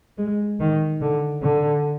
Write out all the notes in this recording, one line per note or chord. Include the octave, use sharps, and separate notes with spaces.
G#3
D#3
D3
D3